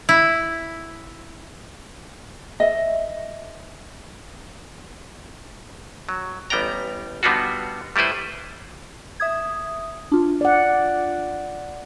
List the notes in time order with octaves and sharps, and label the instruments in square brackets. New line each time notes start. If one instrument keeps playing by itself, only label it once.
[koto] E4
[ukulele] D#5 E5
[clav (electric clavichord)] F#3
A1 G3 B3 D5 G5 A#5
D3 G3 B3 D#4 F4 F#4
G3 A3 E4 B4 C5
[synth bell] E5 D#6 G#6
D4 F4
[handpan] D5 F#5